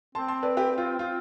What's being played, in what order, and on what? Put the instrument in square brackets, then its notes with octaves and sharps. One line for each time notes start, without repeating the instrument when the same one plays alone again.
[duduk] C4 [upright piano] A5 C6
[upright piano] A5 C6
B4 D5
G4 B4
F4
[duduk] C4 [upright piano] F4